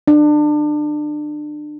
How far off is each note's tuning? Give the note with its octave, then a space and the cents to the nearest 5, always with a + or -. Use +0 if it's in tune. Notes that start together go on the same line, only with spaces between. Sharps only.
D4 +30